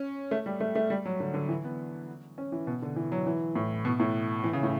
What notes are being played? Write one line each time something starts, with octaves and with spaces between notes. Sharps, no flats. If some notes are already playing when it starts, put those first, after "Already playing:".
Already playing: C#4
A3
G3
A3
A3
G3
F#3
D3
D3
E3
B3
C#4
E3
B2
D3
E3
F#3
E3
A2
B2
A2
E3
C#3
A2